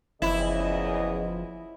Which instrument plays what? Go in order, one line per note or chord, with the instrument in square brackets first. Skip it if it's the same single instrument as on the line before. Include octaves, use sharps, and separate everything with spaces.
[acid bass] F#1 [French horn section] E2 C#3 D#5 [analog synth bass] F3 [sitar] E4